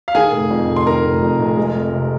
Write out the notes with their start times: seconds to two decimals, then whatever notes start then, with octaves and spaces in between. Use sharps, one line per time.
0.08 F5
0.15 D#3 G#4 G#5
0.32 F1
0.51 F2
0.68 F1
0.76 C6
0.87 D#3 A#4 A#5
1.04 F1
1.22 F2
1.40 F1
1.57 G#3
1.76 F2
1.94 C3